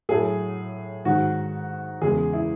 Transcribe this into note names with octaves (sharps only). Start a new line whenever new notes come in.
A2 F#3 A3 G#4
G#2 D#3 G#3 F#4
E2 C#3 G#3 G#4
E4